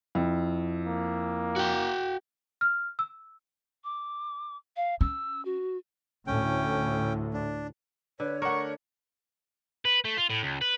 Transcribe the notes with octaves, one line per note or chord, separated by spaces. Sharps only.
F2 E4
A#3
F#4 G5
F6
E6
D6
F5
C#4 E6
F#4
D2 A2 C#4 G5
D4
D3 B4 C#5
A3 D4 A#4 F#5 C#6
B4
A3
F4
A2
C#2
B4